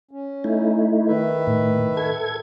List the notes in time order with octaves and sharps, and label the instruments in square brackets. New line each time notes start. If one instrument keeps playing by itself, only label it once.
[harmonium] C#4
[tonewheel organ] A3 D#4 E4
[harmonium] D#3 B4 E5
[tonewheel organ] A2
A4 G#6